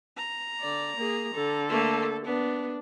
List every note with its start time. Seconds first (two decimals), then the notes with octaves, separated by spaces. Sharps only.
0.17 A#5
0.61 D3 D5
0.96 A#3 G#4
1.35 D3 A4
1.69 A3 A#3
2.25 B3 D4